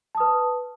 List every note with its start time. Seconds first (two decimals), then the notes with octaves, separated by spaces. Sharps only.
0.15 A5
0.17 D#6
0.20 B4